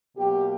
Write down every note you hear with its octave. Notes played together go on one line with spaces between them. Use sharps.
B2 F#3 A#3 G4